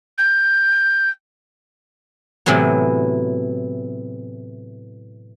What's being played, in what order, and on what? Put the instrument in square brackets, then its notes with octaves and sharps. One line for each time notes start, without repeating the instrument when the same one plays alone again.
[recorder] G6
[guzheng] A2 C3 E3 F#3 B3